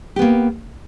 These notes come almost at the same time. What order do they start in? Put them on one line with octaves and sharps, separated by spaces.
G4 B3 A#3